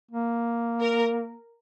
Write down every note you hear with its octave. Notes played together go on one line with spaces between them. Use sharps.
A#3
A#4